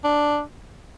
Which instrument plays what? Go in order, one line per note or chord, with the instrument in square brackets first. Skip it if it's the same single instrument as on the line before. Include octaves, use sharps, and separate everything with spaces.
[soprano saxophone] D4